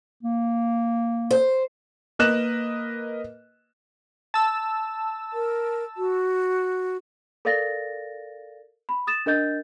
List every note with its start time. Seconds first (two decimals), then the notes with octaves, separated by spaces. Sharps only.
0.23 A#3
1.31 C5
2.19 A#3 A#4 B4 D#5 F#6 E7
4.34 A5 E6
5.33 A#4
5.97 F#4
7.45 A4 A#4 D5 F5 A6 A#6
8.89 B5
9.07 D#6 A6 E7
9.26 D4 A#4 D#5 G6 A6